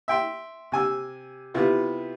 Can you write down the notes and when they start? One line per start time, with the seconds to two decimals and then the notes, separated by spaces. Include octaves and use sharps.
0.08 E5 G5 C6
0.72 C3 G#5 E6
1.54 C3 B3 E4 F4